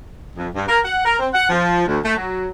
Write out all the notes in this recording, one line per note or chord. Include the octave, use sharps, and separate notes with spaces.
F2
G2
A#4
F#5
A#4
C4
F#5
F3
D2
A3
F#3